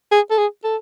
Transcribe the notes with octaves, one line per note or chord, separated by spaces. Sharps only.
G#4
A4
G#4
A4